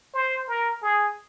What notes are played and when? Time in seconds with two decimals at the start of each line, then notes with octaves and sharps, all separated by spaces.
0.14 C5
0.48 A#4
0.83 G#4